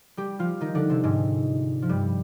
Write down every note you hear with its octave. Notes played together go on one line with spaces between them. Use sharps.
G3 G4
F3 F4
D#3 D#4
D3 D4
C3 C4
G#2 G#3
F3
G2 G3